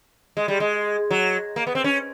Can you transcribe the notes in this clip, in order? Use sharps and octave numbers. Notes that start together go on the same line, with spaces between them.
G#3
G3
G#3
F#3
A#3
B3
C4
C#4